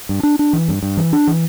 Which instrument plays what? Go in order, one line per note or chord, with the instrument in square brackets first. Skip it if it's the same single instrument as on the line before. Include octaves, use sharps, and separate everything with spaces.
[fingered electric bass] G2
D4
D4
E3
G2
G2
E3
D4
E3